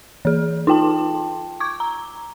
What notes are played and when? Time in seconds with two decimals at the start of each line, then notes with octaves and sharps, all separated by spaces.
0.25 E3 G#4
0.67 D#4 F4 G5 A5
1.60 C#6 D6 G#6
1.80 A#5